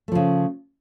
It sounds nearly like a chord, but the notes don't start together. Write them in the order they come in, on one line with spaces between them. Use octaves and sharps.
A3 F3 C#3